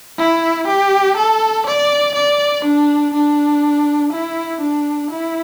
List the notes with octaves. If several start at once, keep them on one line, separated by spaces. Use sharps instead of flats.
E4
G4
A4
D5
D5
D4
D4
E4
D4
E4